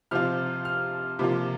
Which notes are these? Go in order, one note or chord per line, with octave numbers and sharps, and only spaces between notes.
C3 F3 C4 F4 F6
F6
C3 F3 A#3 F4